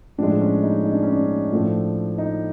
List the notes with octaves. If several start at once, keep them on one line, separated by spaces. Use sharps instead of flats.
A2 F3 G#3 D4
C#4
D#4
D#4
D4
C#4
D4
A2 F3 A3
D#4